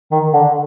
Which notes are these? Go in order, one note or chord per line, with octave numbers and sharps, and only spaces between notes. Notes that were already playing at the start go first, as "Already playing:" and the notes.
D#3
D3